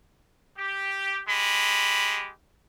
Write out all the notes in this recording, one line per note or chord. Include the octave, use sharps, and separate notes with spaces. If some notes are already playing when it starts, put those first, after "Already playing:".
G4
G#3 G4 B5